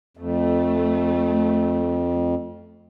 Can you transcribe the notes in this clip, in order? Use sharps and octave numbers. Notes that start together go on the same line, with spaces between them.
F2 A3